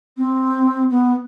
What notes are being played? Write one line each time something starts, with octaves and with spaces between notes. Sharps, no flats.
C4
B3